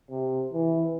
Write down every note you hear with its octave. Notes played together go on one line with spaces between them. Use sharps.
C3
E3